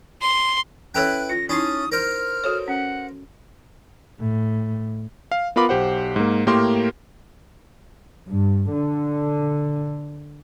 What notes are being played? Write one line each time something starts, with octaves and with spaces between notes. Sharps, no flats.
C6
C#4 E4 A4 B4 C#5 G5 F#6
F4 A#6
C#4 D#4 E4 A5 D#6
A#4 C5 F6
F#4 A4 C#5
C#4 F#5
A2
F5
B3 F4 A#4 B5 D6
B1 G4 C5 F#5
G#2 A#3
A2 A#3 G4 A#4 C6 D6
G2
D3